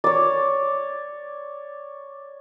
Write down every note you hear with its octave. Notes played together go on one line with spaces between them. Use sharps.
C#5 D5